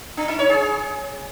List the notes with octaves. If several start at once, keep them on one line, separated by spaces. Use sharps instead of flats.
D4
D#4
C#5
G#4